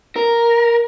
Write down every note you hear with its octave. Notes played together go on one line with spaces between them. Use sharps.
A#4